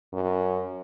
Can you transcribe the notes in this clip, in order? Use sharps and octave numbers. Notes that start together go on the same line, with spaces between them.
F#2